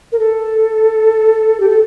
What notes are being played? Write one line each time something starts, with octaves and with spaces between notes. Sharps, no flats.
A#4
A4
G4
A4